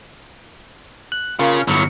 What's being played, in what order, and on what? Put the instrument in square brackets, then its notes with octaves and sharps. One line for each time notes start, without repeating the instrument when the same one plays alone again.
[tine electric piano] F#6
[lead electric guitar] C#3 [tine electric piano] F4 A#4
[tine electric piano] G1 C#7 [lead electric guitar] A2 F#3